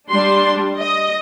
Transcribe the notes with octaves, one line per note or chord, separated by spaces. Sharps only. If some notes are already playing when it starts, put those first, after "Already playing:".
G3 D4 C6
D#5